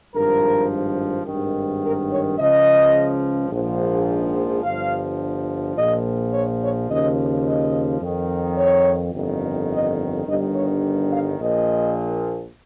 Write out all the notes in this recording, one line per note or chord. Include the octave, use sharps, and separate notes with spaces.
G#1 G2 F3 A#4
G#1 G2 D#3
A#4
C#5
C#2 C#3 F3 D#5
A#1 G#2 F3
G1 G2 F3 F5
A#1 A#2 F3 D#5
C#5
C#5
D#2 C#3 F3 D#5
D#5
F2 D#3
C#5
G1 F2 D#3
D#5
G1 G2 D#3 D#5
C#5
F5
A#1 A#2 F3 D#5